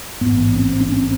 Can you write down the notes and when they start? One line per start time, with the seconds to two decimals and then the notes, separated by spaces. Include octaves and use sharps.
0.21 A1 G#2 B3
0.56 C4
0.81 C#4
0.92 C4